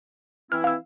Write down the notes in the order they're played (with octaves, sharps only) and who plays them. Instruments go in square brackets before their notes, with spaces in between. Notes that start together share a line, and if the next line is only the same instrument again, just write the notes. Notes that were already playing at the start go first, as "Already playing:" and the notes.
[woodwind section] E3 C4 E4 [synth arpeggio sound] F6
[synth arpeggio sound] F5 E6